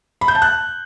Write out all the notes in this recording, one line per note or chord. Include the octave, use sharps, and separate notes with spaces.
B5
G6
A5
F#6